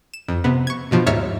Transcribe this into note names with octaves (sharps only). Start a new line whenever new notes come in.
E7
F2
C3 B3
C#6 G#6
G2 B2 F3
D#2 G#2 C#5 E5 F6 A6